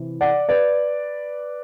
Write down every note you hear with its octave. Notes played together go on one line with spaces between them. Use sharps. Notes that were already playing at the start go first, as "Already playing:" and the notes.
Already playing: C3 E3
D5 F#5
B4 D5